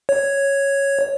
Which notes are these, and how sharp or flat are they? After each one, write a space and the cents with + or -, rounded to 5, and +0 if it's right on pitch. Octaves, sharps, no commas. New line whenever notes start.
C#5 +0